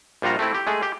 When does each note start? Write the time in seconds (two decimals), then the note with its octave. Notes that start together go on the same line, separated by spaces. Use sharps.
0.22 A#1 G3 F4 F#4 A#5
0.39 A3 C4 E4
0.54 G4
0.67 G#3 A3 G#4
0.83 G4